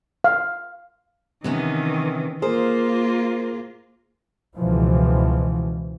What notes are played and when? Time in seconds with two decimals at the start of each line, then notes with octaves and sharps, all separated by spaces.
0.24 F5
1.44 C3 D#3 E3 B3 C#4
2.42 A#3 F4 G#4 A#4 C5
4.57 C#2 B2 E3 F3